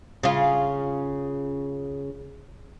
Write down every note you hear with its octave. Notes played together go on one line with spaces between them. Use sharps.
C#3 F4